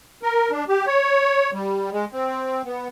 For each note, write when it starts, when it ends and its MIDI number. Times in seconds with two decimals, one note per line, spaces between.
0.23 0.51 70
0.51 0.64 62
0.69 0.86 67
0.86 1.51 73
1.53 1.90 55
1.92 2.05 56
2.13 2.62 60
2.65 2.88 59